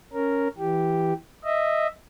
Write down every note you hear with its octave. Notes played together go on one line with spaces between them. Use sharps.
C#4 A#4
E3 G4
D#5 E5